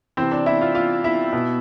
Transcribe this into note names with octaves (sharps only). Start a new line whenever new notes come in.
C3 E3 C4 C5
D4 D5
E4 E5
F4 F5
F4 F5
E4 E5
B2